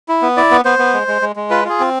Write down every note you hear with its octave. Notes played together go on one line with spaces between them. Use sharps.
E4
B3
E4 D5
B3
B3 C5
B3
G#3
G#3
G#3
G#3
F4 B4
F4 G#4
C4